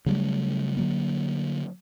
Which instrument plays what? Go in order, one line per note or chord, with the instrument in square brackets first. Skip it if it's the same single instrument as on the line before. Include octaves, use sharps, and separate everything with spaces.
[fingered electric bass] C#3 F#3 G3 A3
D3 F#3 A#3